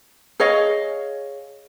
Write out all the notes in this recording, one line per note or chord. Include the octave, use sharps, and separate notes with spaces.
G#4 C#5 D#5 F5